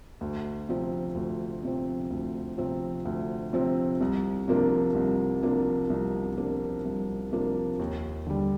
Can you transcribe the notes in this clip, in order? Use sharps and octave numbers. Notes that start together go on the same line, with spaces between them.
D2
C3 F3 C4
D2
C3 F3 C4
D2
C3 F3 C4
D2
C3 F3 C4
C2
C3 F3 A#3 D4
C2
C3 F3 A#3 D4
C2
C3 F3 A#3 D4
C2
C3 F3 A#3 D4
D#2
D3 G3